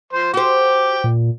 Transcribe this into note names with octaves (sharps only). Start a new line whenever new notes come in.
F3 C5 C6
F#4 C5 G5 D6
A#2